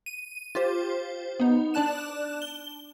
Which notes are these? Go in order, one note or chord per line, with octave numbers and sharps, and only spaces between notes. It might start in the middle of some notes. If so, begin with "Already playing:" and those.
D#7
F4 G4 C5
B3 D#4
D4 D5 A5 F#6 E7
G7